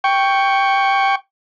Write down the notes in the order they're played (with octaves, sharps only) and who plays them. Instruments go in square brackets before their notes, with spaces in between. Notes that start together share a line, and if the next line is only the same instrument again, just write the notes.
[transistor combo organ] G5 C#6